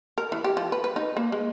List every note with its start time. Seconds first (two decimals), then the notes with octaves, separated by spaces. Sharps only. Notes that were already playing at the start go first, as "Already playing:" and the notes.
0.18 A#4
0.32 E3
0.44 G4
0.57 F3
0.72 B4
0.84 B4
0.96 D#4
1.17 A#3
1.32 G#3